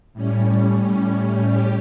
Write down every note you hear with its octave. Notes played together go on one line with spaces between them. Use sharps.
A2 G3 C#4
G4